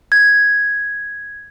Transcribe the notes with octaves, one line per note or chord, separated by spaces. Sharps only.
G#6